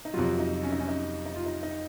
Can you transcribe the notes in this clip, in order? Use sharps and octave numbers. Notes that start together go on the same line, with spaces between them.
D#4
F2 C3 F#3 F4
D#4
C#4
D#4
C#4
D#4
D#4
F4
D#4
D#4